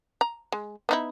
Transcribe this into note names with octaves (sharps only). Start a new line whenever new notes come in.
A#5
G#3
B3 D#4 E4